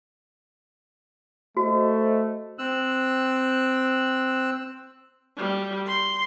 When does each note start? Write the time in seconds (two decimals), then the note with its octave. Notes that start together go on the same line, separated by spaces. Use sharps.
1.57 A3 F#4 C5 D#5
2.59 C4 E6 F#6
5.37 G3
5.87 C6